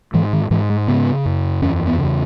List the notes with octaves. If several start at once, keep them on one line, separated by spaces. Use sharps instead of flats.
G#2 E3
D#3
G#2 E3
G#3
C#3 B3
F#2
E2 C#4
B3
C#3